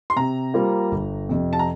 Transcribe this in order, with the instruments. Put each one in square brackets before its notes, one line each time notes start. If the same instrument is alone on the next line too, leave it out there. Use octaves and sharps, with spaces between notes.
[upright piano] C6
[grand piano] C3 [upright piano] A#5
[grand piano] G3 A#3 F4 C5
G1
F2 C3
[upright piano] A5
A#5